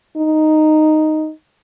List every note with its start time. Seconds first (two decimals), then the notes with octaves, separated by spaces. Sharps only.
0.17 D#4